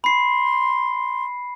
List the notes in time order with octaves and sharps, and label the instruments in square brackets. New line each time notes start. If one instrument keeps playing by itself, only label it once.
[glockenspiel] B5 C7 [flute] C6